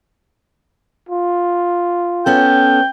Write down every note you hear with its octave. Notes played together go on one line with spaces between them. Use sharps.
F4
B3 C#4 A4 G5